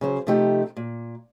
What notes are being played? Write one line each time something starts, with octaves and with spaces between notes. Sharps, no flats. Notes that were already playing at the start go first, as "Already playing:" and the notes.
C#3 F#3 C5
C3 F3 A3 D#4 G4
A#2